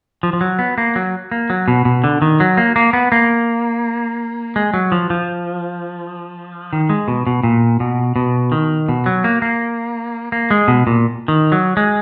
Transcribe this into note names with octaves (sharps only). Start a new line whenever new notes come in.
F3
F3
F#3
B3
A#3
F#3
A#3
F#3
B2
B2
D3
D#3
F#3
A#3
A#3
B3
A#3
G#3
F#3
F3
F3
D#3
G#3
B2
B2
A#2
B2
B2
D#3
B2
F#3
A#3
A#3
A#3
G#3
B2
A#2
D#3
F#3
G#3